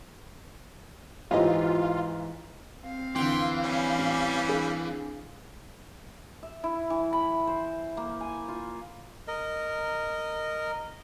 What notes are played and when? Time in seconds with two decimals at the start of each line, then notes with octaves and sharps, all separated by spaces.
1.31 G#2 E3 F4 G4 C#5 D#5
2.85 C4 F5
3.15 F2 D3 E3 G5 C6
3.64 G3 C#4
3.98 A1 F6
4.48 D4 G#4
6.43 E5
6.64 E4
6.90 E3
7.13 B5
7.47 C5
7.97 A#3
8.21 G#5
8.48 F4
9.28 A#4 D#5